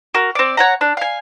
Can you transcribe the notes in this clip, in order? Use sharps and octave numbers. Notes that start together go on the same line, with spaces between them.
F#4 A#4
C4 D5
C#5 F#5 A#5
D4
F5 G#5